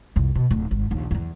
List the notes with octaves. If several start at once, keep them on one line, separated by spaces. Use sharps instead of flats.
C2 F2
B2
D1
G#1
A#1 D#2
E2 F#3